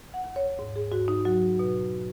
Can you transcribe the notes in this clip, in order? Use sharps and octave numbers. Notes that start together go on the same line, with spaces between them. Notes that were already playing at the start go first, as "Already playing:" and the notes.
F#5
D#2
C#5
G#2
G#4
G#2 F#4
D#4
F#3 F#4
B2